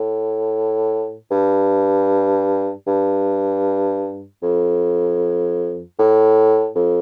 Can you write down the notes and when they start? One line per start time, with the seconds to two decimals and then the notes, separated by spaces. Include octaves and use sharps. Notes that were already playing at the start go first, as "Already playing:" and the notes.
Already playing: A2
1.31 G2
2.87 G2
4.43 F2
5.99 A2
6.76 F2